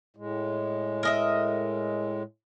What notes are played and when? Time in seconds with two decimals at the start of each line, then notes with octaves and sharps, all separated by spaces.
0.16 A2 G#3
1.03 A#4 D#5 E5